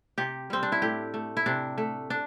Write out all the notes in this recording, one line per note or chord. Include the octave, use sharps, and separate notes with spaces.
C3 G4
G3 C4
D4
E4
A2 G4
A3
E4
C3 D4
A3
D4